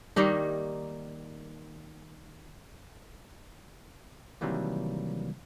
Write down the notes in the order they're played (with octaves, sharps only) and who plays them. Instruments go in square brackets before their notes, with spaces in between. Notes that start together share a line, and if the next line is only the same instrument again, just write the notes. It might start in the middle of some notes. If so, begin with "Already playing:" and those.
[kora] D#3 G3 A#3 D#4
[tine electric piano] C3 D#3 E3 F#3 G3 A#3